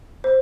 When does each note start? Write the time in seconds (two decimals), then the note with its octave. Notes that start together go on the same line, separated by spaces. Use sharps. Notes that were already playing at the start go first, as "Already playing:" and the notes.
0.24 C5